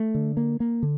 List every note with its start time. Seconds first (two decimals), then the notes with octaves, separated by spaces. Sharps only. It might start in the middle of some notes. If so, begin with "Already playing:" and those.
Already playing: A3
0.14 D3
0.37 A#3
0.60 A#3
0.83 D3